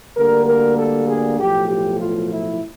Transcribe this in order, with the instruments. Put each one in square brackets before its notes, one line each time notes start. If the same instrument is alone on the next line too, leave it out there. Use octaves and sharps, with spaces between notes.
[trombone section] D2 D3 G3 A#3 A#4
A#4
A4
G#4
B1 A2 F3 G4
G4
F4
E4